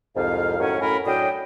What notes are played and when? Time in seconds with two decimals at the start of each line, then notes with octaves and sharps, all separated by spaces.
0.16 C2 F2 G#2 F5
0.59 F#2 A2 D#3 C#4 F#5
0.80 F#2 A2 C#4 A#4 B5
1.06 A2 F#3 D4 D#5 G5